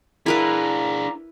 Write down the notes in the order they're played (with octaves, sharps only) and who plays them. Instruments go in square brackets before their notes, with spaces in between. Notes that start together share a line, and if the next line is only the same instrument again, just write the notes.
[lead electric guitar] D4 G#4 [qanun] E4 A#4 B4 [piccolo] A#5